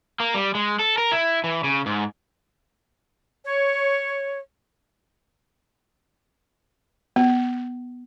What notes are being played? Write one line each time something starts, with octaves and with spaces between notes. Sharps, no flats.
A#3
G3
G#3
A4
A#4
E4
E3
C#3
G#2
C#5
B3